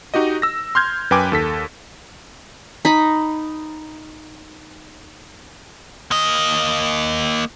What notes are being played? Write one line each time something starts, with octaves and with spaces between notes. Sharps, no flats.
D#4 F#4 G4 D#5
E6 A#6
C6 F6 G6 G#6
F#2 B4 G5 G#5 D6
D#2 A4 B6
D#4 B5
A#3 D#5